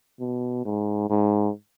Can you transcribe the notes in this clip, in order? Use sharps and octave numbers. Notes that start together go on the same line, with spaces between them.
B2
G#2
G#2